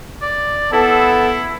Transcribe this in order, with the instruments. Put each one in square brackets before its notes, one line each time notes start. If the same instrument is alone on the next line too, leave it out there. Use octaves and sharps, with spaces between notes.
[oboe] D5
[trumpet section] B3 A4 [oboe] E4